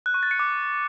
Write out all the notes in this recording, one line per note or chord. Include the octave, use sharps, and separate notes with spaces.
F#6
C#6
A6
C#7
D6